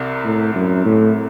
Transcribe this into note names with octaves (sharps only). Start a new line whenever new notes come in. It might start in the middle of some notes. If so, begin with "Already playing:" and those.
Already playing: C2 C3 C4
A2
F#2
A2